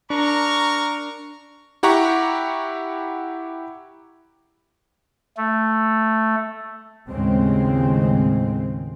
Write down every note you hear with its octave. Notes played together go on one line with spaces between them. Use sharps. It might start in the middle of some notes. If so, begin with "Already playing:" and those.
D4 A#4 A#5 C#6
E4 G4 F#5 A#5 C#6
A3
D#2 A2 C#3 G#3 C4